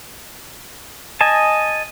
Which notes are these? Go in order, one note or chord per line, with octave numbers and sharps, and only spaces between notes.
D#5 G#5 A5